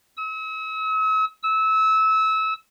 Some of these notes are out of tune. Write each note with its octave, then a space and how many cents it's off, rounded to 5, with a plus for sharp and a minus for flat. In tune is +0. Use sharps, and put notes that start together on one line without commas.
E6 -45
E6 -25